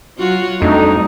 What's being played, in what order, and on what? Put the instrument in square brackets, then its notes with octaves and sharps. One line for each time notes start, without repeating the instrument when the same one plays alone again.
[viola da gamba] F#3 F4 F#4
[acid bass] F2 [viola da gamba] G3 [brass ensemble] A3 D4 D#4